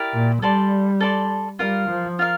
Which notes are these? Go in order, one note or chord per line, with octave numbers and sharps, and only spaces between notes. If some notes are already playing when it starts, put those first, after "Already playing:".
Already playing: E4 G4 A#4 D5
A#2
G3 A4 D5 A5 C6
A4 D5 A5 C6
G3 F4 A#4 F5
F3
F4 A#4 F5